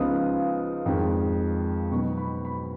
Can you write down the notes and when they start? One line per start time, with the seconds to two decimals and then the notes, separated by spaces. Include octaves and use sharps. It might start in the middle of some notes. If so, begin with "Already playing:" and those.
Already playing: C#2 C#3 F3 B3 D#4 D#6
0.86 F2 D#3 G#3
1.91 B2 F#3 B3 D#4 C#6
2.17 B5
2.45 B5